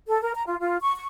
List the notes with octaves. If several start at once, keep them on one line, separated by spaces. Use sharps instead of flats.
A4
A#4
A#5
F4
F4
C#6
C#6